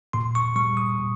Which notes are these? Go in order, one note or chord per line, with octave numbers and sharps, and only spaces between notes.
A#2 C6
C#6
G3 C#6
D#6
A#2